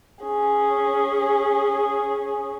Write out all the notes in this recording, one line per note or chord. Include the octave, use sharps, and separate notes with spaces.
C#4 G#4